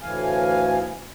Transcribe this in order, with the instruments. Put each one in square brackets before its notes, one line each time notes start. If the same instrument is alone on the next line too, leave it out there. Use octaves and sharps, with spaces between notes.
[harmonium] D2 A2 E3 F5 G#5